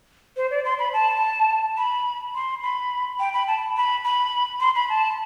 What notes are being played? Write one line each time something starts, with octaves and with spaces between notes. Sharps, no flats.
C5
D5
C6
B5
A5
B5
C6
B5
G5
B5
A5
B5
B5
C6
B5
A5